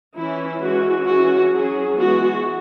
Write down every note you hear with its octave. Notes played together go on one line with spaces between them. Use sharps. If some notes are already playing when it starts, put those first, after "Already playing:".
E3 C#4 E4
E3 G#3 C#4 F#4
E3 G#3 C#4 F#4
F#3 C#4 G#4
E3 G#3 B3 F#4